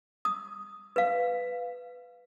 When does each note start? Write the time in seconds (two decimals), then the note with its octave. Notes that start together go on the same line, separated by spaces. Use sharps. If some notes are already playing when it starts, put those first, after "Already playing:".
0.25 D#6
0.96 B4 F5